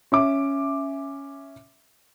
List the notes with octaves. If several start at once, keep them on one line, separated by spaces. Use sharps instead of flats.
C#4 E5 D6